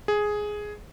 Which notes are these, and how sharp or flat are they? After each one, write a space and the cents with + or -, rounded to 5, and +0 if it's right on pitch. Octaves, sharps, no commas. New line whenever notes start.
G#4 +5